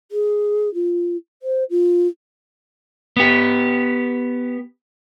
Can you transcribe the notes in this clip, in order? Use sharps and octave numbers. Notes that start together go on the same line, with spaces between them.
G#4
F4
C5
F4
B3 G4